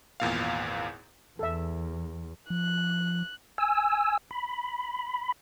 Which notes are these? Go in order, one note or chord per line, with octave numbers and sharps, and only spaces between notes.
G#1 E2 A#2 F5
E2 A4 E5
F3 F#6
G#5 E6
B5